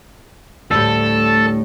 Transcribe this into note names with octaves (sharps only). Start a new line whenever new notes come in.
D2 A2 G3 A4